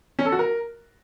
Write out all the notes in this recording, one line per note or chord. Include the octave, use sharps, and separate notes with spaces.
C#4
A4
F#4
A#4